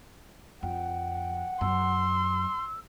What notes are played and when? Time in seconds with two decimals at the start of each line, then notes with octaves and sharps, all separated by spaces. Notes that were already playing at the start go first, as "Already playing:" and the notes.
0.63 F2 F#5 G5
1.61 F#2 C6 E6